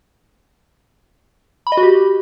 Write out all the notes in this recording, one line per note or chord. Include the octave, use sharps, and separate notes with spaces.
B5
D#5
F#4
G4